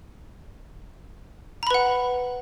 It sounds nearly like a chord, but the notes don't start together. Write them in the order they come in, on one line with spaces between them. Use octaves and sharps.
A#5 B5 B4 F#5